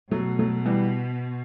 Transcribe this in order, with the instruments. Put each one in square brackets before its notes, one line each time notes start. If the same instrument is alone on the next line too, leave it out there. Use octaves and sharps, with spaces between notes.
[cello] B2 [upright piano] F#3 A3
[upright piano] F#3 A3
E3 G3